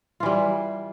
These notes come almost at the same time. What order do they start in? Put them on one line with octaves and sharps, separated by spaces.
F4 E3 G3